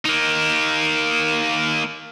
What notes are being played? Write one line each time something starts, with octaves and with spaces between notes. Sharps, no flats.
A#3 D#4